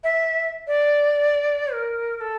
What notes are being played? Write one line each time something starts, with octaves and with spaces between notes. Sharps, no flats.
E5
D5
A#4
A#4
A4